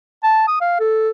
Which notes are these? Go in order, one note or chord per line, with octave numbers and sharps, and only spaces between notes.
A5
D#6
F5
A4